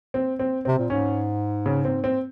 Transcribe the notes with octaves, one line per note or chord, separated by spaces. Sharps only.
C4
C4
C3 C4
A#2
G#2 C#4
C#3
C4
C4